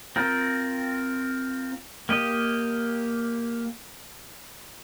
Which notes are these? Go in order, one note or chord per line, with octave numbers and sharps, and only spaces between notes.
C4 F4 A#4
A#3 G4 D#5